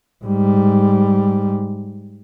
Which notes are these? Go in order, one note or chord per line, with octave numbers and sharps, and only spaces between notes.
G#2 G3